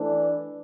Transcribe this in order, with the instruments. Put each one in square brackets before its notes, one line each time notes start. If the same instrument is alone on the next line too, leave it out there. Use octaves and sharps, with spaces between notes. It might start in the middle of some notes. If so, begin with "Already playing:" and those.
Already playing: [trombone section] E3 A3 D4